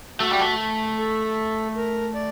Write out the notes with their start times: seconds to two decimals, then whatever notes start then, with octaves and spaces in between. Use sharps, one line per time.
0.20 A3 F#4
0.31 G3
0.41 A3
0.98 A4
1.76 A#4
2.14 D5